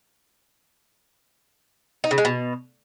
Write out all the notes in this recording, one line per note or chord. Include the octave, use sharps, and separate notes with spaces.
D#4
C#3
G#3
B2